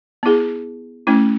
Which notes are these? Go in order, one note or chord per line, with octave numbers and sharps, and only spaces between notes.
B3 E4 G#4
A3 C#4 E4